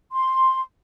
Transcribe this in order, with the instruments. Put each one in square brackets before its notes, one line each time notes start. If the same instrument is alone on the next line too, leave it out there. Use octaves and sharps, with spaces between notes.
[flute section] C6